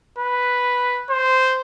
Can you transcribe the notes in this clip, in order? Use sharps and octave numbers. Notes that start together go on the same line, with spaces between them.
B4
C5